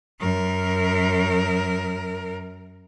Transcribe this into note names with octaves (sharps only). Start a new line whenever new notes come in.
F#2 A#4